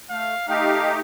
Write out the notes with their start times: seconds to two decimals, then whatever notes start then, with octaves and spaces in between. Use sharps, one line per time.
0.10 A3 F5
0.48 A3 D#4 G4 F5